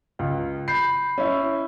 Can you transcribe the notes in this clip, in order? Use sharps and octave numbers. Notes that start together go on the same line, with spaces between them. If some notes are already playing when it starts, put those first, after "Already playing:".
C#2
B5 G6 C7
C#4 E4